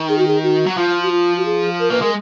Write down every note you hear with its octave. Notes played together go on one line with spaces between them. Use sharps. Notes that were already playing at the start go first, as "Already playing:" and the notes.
Already playing: D#3
G#4
F#4
G#4
F#4
F#3
F3 F4
F#4
F4
F#4
G#4
A#4
A#3 B4
G#3 A#4